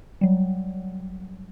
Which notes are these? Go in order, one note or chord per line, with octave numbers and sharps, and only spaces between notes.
F#3 G3